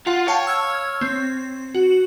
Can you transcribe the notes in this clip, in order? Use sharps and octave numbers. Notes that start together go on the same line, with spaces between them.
F4 F#5
C#5 F5 G5 A5
E6 F6 G#6
C4
F#4